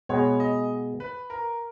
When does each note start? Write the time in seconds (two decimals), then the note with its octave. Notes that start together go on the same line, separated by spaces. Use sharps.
0.09 B2 G#3 B3 C#5
0.40 D#5
1.00 B4
1.30 A#4